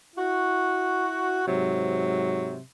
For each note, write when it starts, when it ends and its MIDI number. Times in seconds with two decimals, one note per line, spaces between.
0.17 1.43 64
0.17 1.43 66
1.46 2.58 44
1.46 2.58 48
1.46 2.58 54